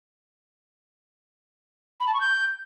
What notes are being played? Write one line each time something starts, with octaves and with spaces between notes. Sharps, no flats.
B5
A5
C#6
G6